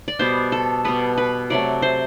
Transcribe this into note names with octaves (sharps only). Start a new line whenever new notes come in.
D5
B2 G3 B3 C5
A4
B2 G3 B3 B4
B4
C3 F#3 A3 D5
C5